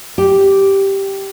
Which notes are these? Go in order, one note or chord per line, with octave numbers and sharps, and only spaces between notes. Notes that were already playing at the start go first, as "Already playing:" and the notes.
G4